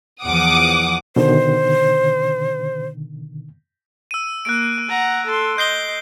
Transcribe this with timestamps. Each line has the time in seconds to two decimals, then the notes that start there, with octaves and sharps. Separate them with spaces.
0.24 E2 F3 F#5 D6 D#6
1.16 B2 D3 D#3 C5
4.11 E6 D#7
4.45 A#3 F#6 D7
4.89 F#5 A#5
5.26 A4 C6
5.58 D#5 G6 C7 G7